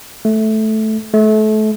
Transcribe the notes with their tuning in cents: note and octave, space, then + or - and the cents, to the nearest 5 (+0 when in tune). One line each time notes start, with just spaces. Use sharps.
A3 -10
A3 -30